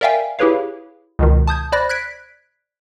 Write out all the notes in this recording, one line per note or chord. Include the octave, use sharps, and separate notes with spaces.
A#4 D5 E5 F5 G5 G#5
E4 G4 G#4 B4 C#5 F5
C#2 B2 D#3
A5 D#6 G6 G#6
C5 D5 B5 F#6 A#6
F#6 G#6 B6 D7